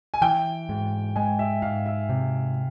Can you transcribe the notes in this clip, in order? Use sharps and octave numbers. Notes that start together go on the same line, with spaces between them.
G#5
E3 G5
G#2
G#3 G#5
E5
G#2 F5
E5
C3